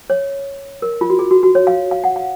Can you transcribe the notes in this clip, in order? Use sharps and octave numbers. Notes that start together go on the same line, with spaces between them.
C#5
A#4
F4
F#4
G#4
F#4
F#4
C#5
F5
F5
F#5
F5